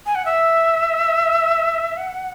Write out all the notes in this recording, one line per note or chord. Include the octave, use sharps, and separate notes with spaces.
G#5
F#5
E5
F#5